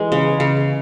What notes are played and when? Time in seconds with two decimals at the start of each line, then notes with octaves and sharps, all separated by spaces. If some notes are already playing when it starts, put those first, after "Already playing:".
Already playing: E3 G#3
0.12 C#3
0.40 C#3